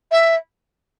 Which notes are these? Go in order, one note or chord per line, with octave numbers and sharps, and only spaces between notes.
E5